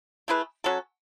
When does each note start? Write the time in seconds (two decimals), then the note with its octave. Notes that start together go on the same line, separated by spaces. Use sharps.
0.28 A3 E4 G#4 B4
0.64 F#3 C#4 F#4 A4